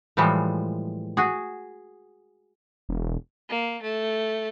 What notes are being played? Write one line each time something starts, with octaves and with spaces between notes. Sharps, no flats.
A2 E3 F3 G3 G#3
F#4 G#4
E1
A#3
A3